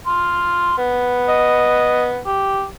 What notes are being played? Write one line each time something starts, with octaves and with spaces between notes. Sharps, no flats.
C6 F6
B3
D#5
G4